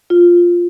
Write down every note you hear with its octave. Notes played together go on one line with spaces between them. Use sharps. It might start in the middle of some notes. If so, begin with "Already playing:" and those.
F4